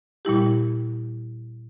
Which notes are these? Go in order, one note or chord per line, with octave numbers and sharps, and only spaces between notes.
A#2 G3 E4 G4